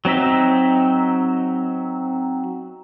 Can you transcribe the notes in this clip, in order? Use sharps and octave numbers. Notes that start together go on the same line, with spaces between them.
F#3 C4 D#4 E5